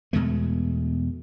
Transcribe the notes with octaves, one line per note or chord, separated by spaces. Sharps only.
E2 B2 G#3 A3